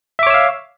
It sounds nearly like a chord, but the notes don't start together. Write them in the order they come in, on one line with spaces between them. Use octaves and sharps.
E5 D6 C#5 E6 F5